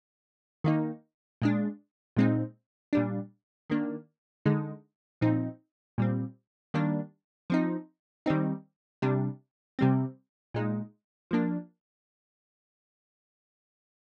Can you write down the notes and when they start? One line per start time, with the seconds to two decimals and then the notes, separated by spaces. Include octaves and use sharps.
0.64 D#3 A#3 D#4
1.42 A#2 G#3 D4
2.17 A#2 G#3 C4 D#4
2.93 A#2 G3 D4
3.70 D#3 A#3 D4
4.45 D3 G#3 D#4
5.21 A#2 F3 C4 D#4
5.98 A#2 G3 C4
6.74 D#3 G3 A#3 D4
7.50 F3 C4 D#4
8.26 D#3 G3 C4 D#4
9.02 C3 G3 D4
9.79 C3 G3 C4
10.54 A#2 G#3 D#4
11.31 F3 A#3 D4